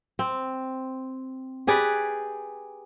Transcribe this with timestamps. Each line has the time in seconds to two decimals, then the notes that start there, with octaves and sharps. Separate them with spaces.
0.19 C4
1.67 G4 G#4 B4 D5